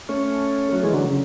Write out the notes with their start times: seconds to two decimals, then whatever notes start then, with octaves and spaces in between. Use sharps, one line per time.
0.09 A3 C#4
0.73 F#3 A3
0.83 E3 G#3
0.93 D3 F#3
1.04 C#3